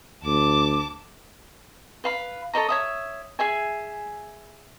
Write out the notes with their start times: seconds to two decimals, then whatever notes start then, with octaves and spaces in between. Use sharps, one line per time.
0.25 D2 A5 D6
2.04 B4 F5 B5
2.53 A4 C#5 D#5 A#5
2.69 C#5 E5 D#6
3.39 G#4 E5 G#5